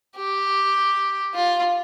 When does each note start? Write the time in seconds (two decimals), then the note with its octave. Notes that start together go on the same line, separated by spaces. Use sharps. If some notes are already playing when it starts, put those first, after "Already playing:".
0.17 G4
1.35 F4